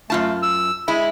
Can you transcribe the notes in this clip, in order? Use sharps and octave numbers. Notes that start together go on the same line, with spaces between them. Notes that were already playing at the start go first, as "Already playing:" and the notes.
F#2 A3 F4 A5
E6
G#3 E4 B5